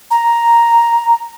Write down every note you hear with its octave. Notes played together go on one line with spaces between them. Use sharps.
A#5